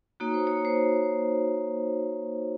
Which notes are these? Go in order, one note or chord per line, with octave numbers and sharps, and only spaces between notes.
A#3 D#4 F#4 C#5
C5
C#5
C5